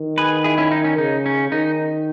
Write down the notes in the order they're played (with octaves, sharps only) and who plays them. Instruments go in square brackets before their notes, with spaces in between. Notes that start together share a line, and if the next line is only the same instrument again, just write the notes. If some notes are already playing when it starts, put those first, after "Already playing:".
Already playing: [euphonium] D#3
[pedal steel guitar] G#4 B4
E4 G#4
C#4 E4
D#4
C#4
[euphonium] C#3 [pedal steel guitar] D#4
[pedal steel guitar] C#4
[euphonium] D#3 [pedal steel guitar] D#4